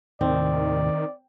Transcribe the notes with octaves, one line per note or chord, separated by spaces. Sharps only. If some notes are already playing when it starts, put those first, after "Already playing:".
D#2 A2 C3 D#3 C4 D5